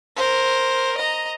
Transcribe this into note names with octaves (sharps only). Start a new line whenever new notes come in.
A#4 C5
D#5 A#5